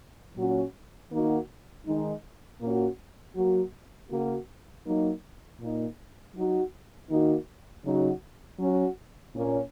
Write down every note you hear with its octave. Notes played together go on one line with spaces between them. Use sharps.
A#2 F#3 C#4 F#4
D#3 A#3 D#4 F#4
D#3 G#3 D#4
A#2 A#3 C#4 F#4
F#3 A#3 F#4
C#3 A#3 F#4
F#3 A#3 D#4
A#2 A#3 D#4
F#3 D#4 F#4
D#3 A#3 D#4 F#4
C#3 F#3 D#4 F#4
F#3 C#4 F#4
A#2 A#3 C#4